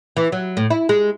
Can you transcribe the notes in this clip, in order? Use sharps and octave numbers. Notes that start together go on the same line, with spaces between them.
E3
F#3
A2
E4
G#3